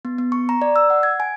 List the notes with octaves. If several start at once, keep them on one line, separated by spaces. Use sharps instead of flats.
B3
B3
C#6
A#5
D5
E6
F#5
G#6
G#5